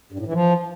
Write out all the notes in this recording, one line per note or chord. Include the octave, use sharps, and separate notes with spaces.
G2
A2
E3
F3